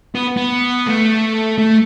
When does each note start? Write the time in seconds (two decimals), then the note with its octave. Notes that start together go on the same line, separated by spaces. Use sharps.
0.15 B3
0.37 B3
0.87 A3
1.58 A3